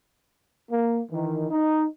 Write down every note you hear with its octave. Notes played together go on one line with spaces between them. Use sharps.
A#3
D#3 E3
D#4